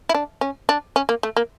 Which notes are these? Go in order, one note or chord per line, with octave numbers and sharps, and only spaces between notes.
E4
D4
C#4
D4
C#4
A#3
A3
A#3